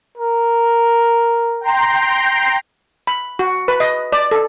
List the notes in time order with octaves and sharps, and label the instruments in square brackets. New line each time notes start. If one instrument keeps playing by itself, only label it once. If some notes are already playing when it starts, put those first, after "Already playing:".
[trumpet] A#4
[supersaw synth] G5 A#5 C6
[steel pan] B5
F#4
B4
D#5
D5
A4